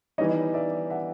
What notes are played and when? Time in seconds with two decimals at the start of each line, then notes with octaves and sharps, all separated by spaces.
0.18 E3 G3 B3 D#4 C#5 D#5
0.54 D5 E5
0.90 E5 F#5